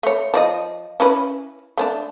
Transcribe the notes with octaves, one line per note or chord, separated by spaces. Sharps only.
A3 C#5
F3 D5 D#5
C#4 E4 B4
A3 C#4 D4